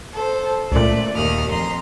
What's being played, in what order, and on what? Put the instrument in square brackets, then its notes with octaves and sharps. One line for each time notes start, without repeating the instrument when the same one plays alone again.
[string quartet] A4 C5
[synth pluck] C#2 A#2 [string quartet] A3 D5
[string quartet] D#2 D#6 F6
F2 A#5 C6